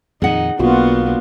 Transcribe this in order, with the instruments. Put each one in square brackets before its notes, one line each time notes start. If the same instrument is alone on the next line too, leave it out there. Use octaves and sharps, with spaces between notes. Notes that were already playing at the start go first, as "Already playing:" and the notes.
[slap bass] F2 A#2 D#3 [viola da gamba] D#4 [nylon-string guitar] G#4 F#5
[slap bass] B1 [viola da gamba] A#3 B3 D4 [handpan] F4 F#4